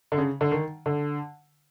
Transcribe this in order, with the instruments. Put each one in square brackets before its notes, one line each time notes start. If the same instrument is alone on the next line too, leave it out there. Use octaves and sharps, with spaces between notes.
[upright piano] D3
C#3
D3
D#3
D3